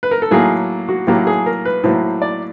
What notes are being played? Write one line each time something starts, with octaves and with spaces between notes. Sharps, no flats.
B4
A#4
A4
A2 F#3 A#3 G#4
F#4
A2 F#3 A#3 G4
G#4
A#4
B4
A2 F#3 A#3 C5
D5